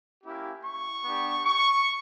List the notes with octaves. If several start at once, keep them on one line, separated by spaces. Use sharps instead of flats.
A#3 C#4 E4 G4
C#6
B3 D4 G4
C#6